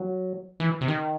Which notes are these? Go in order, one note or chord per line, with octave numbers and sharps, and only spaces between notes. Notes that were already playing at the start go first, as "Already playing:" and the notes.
Already playing: F#3
E3
C3
D#3